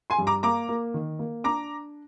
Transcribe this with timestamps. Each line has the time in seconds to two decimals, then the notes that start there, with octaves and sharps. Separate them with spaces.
0.10 G#5 C6
0.19 G2
0.27 A#5 D6
0.43 A#3 A#5 D6
0.69 A#3
0.94 D#3
1.19 A#3
1.44 D4 A#5 D6